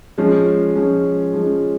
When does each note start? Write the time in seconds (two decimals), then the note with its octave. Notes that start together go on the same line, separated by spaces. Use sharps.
0.18 F3 G#3 C#4
0.76 F3 G#3 C#4
1.33 F3 G#3 C#4